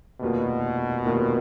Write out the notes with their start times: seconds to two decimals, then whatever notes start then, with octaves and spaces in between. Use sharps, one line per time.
0.21 F1 D#2 B2 D#3 A#3 F4
1.04 F1 D#2 D#3 A#3 F4